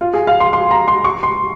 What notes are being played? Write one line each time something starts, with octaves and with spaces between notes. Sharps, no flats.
F4
G#4
F5
C6
C6
A#5
C6
C#6
C6